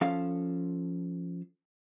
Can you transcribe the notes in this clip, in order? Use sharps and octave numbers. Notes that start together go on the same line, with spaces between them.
F3 C#4 A4 F5